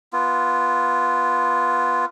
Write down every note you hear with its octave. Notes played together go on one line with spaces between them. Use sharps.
B3 F4